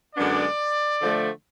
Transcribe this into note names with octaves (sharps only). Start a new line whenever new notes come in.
F#2 D3 G#3 B3 D4 D5
D3 F3 A3